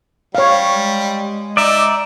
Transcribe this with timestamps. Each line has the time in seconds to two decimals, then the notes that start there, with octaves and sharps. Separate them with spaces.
0.35 G3 C#5 F5
0.73 G#3
1.57 D#4 D5 E5